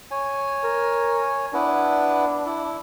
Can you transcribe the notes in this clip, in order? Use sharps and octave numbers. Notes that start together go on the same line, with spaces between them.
C#5 G#5
A#4
B3 D4 E4 B4
E4